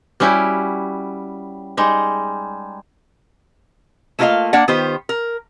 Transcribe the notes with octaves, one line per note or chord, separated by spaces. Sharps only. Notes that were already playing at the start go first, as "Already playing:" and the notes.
G3 C#4 E4 F#4 G4
G3 G#3 D#4
A3 A#3 F4 A#4 D#5 F5
A#3 D4 D5 F#5
D#3 B3 F4 G4 C5
A#4